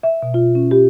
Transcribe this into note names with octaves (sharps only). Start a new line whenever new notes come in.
E5
B2
F4
C#4
G4